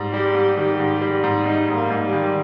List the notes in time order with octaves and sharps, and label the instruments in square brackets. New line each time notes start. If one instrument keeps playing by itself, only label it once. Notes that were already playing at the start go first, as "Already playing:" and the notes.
Already playing: [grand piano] G#2 G3
[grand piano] G3 [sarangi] G4
[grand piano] G#2
[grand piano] D#3 [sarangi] G4
[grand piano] G#2
G3
G#2
[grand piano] G#2 [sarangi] D#4
[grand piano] G#2
[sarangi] A#3
[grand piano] G#2
[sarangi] G3
[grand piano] D#3